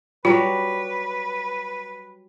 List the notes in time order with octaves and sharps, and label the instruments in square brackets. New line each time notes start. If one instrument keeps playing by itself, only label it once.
[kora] F#3 G3 [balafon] F4 [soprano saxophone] B4